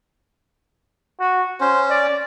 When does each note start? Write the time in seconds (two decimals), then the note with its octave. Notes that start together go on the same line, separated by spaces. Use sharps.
1.19 F#4
1.61 C#4 C5
1.90 D5